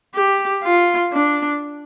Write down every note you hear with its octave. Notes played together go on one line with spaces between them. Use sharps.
G4
F4
D4